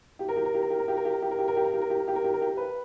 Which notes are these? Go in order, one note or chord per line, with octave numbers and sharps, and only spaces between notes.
G4
A#4
G4
A#4
G4
A#4
G4
A#4
G4
A#4
G4
A#4
G4
A#4
G4
A#4
G4
A#4
G4
A#4
G4
A#4
G4
A#4
G4
A#4
G4
B4